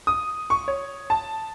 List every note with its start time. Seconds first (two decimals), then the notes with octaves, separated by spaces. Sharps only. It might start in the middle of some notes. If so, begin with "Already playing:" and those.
0.07 D#6
0.50 C#6
0.68 C#5
1.10 A5